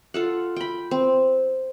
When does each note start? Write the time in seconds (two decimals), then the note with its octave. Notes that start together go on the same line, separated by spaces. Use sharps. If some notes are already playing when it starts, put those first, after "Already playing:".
0.14 F4 A4 F#5
0.56 G5 B5
0.91 C4